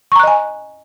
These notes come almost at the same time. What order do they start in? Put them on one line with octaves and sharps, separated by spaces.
C#6 A#5 F#6 D#5 G#5